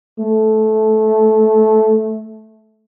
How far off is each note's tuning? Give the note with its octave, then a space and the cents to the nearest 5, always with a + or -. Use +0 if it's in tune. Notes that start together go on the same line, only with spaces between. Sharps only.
A3 -15